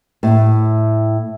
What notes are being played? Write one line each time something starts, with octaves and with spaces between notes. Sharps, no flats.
A2